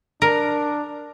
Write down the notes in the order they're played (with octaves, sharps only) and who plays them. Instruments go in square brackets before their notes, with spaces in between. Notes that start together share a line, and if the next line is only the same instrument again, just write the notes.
[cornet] D4 [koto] A#4